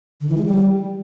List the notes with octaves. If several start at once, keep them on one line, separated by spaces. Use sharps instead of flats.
D3
E3
G#3
G3